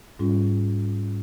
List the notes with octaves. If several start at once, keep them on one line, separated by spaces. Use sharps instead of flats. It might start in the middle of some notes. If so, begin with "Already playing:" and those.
G#2 G3 C#4 F4